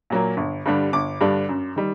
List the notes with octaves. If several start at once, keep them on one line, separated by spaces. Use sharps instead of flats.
A#2 F#3 A#3
G1
G2 D3 G3 D4
G1 D6
G2 D3 G3 D4
F#2
D#3 G3